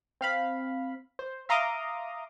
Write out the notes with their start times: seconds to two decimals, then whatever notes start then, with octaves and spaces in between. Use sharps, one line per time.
0.21 C4 F5 B5
1.19 C5
1.49 E5 F5 A#5 C6 D6 D#6